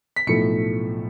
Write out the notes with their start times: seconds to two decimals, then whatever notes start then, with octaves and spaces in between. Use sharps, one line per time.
0.16 B6
0.26 B1 A2 F3 A3 C#7